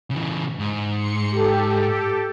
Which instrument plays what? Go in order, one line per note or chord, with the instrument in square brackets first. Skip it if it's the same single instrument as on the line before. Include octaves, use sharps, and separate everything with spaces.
[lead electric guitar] C#3 E3
G#2
[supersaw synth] C6 C#7
G4 A4